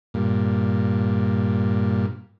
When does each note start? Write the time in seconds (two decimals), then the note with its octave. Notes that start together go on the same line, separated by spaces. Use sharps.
0.14 G2 A#2